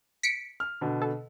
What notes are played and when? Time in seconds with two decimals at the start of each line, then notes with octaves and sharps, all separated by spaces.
0.23 B6 C#7 D7
0.60 F6
0.81 B2 D3
1.02 A4